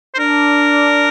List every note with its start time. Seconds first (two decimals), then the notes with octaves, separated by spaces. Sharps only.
0.15 C5
0.19 D4 A#4